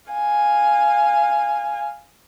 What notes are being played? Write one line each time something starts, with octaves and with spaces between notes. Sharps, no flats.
F5 G#5